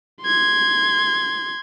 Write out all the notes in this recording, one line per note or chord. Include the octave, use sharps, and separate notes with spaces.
C6 G#6